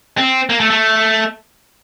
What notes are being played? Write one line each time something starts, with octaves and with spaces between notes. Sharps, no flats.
C4
A#3
A3
A3